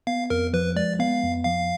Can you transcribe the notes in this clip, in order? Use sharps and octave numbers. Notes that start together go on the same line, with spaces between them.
B3 F5
F2 A#4
F3 B4
G#3 D5
B3 F5
F2
F3 F5